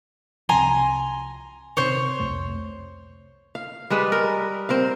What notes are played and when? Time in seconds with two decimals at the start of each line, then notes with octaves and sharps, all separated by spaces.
0.49 C2 C3 F3 G#5 A#5 C6
1.77 C3 D#3 C5 C#5
2.20 C2 F2 A3
3.55 F5
3.90 G3 G#3 B4
4.12 A#4
4.69 C4 A#4 F5